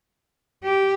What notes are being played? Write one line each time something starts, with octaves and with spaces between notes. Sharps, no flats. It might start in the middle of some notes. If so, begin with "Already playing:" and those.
G4